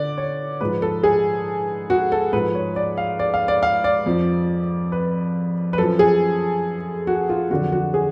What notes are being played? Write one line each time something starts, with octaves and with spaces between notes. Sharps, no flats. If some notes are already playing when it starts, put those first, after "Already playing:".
Already playing: D3 D5
C#5
G#2 F3 B4
A4
G#4
F#4
A4
G#2 F3 B4
C#5
D5
F5
D5
F5
D5
F5
D5
F2 F3
B4
B4
F#2 F3 A4
G#4
F#4
F4
F2 D3 F#3 F#4
F#4
G#4